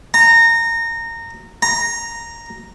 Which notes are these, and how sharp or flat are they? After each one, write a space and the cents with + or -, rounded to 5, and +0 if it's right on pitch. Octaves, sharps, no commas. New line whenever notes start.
A#5 -20
A#5 -5